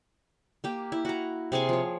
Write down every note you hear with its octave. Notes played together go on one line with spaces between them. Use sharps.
A#3 G4
E4
F#4 A#5
C3 G#4 F5 G#5
F3 C#5